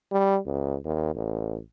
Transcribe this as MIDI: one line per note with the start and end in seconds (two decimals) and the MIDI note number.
0.12 0.38 55
0.46 0.76 37
0.85 1.13 39
1.15 1.59 33